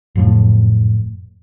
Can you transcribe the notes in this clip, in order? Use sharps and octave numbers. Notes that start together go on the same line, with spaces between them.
F#1 F2 A2